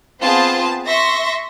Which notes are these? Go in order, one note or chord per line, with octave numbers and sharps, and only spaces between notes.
B3 C4 F4 G#4 C5 A5
E5 C6 C#6 A#6